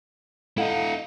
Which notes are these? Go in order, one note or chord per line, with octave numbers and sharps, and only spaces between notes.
E4 A4 D#5 F5 F#5